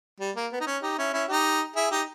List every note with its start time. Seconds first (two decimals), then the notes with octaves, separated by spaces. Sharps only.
0.20 G3
0.36 A#3
0.52 B3
0.60 D#4
0.67 C#4
0.83 D#4 G4
0.98 C#4 E4
1.13 C#4 E4
1.28 D#4 G4
1.76 E4 G#4
1.91 D#4 G4